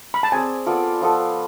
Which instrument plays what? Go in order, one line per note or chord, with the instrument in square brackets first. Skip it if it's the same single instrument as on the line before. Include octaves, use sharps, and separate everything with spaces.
[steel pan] B5
A5
[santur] C4 G#4 D5 [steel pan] G#5
[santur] B3 F4 A4 D5
F3 B3 F4 A4